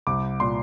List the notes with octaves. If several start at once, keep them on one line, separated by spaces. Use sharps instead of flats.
C2 D6
A#2 C6